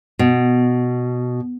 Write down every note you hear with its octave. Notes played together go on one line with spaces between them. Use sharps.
B2